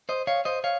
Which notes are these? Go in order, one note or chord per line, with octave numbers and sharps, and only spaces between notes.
C5 D#5
C#5 F5
C5 D#5
C#5 F5